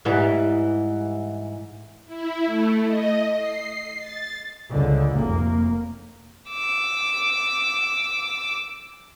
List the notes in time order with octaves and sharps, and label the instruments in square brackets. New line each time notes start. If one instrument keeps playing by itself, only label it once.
[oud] G#2 E3 G3
[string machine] E4
A3
D#5
C7
A6
[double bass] C#2 D3
F1 A#3
[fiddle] D6 E6